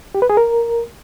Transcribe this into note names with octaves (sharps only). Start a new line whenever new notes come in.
G4
B4
G#4
A#4